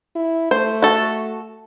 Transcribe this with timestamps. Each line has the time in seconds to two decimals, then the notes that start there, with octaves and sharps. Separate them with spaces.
0.16 E4
0.51 A3 C5
0.82 F#4 A4